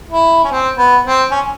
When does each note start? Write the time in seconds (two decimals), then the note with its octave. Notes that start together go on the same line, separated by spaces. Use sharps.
0.11 E4
0.44 C#4
0.51 C4
0.78 B3
1.05 C4
1.31 C#4